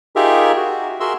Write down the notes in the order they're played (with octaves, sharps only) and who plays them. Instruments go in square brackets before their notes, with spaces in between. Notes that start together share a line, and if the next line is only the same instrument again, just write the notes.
[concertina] D#4 F4 G4 G#4 A#4 E5
F#4
F#4 G#4 A#4 E5 C6 E6